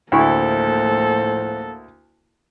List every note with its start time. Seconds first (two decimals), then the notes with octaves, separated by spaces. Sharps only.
0.12 D2 A2 F3 A#3 E4 A4 C5 C#6